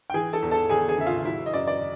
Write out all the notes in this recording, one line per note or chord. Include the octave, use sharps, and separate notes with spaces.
G5
E3 G#4 G#5
A4 A5
E2
A4 A5
E2 G#4 G#5
G#4 G#5
C#3 E5
F4 F5
F#3 E4 E5
D#5
F#2 D5
D5